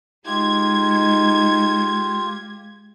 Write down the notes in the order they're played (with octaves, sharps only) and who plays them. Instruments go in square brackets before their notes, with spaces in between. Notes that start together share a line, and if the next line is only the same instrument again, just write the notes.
[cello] G#3 [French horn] D#4 [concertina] F4 G4 [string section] G#6